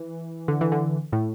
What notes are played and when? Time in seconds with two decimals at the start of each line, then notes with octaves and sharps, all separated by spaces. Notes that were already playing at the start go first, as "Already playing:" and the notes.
Already playing: E3
0.48 D3
0.61 E3
0.72 D3
1.12 A2